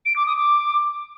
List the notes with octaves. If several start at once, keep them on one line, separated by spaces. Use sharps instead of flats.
D7
D6
D#6
D6